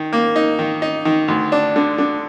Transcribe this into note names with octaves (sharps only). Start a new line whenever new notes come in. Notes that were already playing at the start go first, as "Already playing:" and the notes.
Already playing: D#3
A#3
D#4
D#3
D#4
D#3
D2
D4
D3
D3